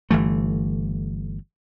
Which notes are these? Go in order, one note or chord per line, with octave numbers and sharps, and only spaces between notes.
G1 E3 A3